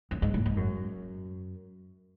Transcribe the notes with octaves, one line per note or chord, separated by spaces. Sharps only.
F#2
G#2
A2
G#2
F#2